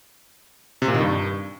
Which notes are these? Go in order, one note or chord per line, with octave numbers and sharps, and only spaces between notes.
C3
A#2
D#3
G2